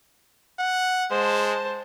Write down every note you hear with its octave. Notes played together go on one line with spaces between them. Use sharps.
F#5
G#3 C5 A5